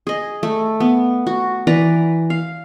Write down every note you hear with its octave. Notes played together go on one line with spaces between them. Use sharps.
G#4 D#5
A3
B3
F#4
E3 B4 D5 A#5
F5